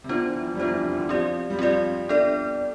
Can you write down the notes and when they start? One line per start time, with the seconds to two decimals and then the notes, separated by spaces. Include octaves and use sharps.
0.04 C3
0.09 D3 B3 D4 F4 C5
0.26 E3
0.43 F3
0.55 G3
0.59 F3 B3 D4 F4 C5
0.72 E3
0.84 C3
0.97 D3
1.09 F3 C4 G4 D5
1.50 G3
1.59 F3 C4 G4 D5
2.09 B3 D4 A4 D5